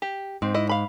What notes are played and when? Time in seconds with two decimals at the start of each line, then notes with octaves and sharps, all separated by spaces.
0.02 G4
0.42 G#2 C4
0.54 E4 D#5
0.69 F5 B5